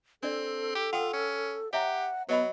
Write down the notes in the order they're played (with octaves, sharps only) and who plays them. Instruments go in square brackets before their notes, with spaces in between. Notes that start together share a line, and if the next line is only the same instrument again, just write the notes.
[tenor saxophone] C4 [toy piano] D4 D5 [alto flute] A4
[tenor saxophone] G4
[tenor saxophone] F4 [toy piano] F#5 G5 D#6
[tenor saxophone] C#4
[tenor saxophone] G4 [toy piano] C#5 E5 A#5 [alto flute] F#5
[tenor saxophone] F#3 [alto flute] B3 [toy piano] B4 D#5 B5